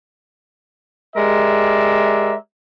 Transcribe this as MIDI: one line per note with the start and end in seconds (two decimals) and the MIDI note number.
1.16 2.34 56
1.16 2.34 67
1.16 2.34 70
1.16 2.34 74
1.16 2.34 76